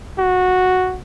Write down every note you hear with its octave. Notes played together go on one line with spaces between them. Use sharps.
F#4